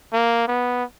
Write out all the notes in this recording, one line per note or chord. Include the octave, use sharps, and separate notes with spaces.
A#3
B3